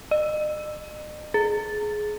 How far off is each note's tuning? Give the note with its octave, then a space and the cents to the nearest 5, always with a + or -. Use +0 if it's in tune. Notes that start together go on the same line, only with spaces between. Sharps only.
D#5 -40
G#4 +20